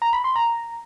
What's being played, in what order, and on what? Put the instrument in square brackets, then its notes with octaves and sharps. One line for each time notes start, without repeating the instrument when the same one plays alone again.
[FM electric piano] A#5
B5
C6
A#5